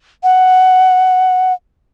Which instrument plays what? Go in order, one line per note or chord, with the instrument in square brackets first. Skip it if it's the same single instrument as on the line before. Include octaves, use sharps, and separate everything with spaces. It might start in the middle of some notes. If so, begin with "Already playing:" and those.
[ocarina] F#5